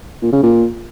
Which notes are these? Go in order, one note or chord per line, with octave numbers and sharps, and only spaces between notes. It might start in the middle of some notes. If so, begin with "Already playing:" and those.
A#2
C#3
A#2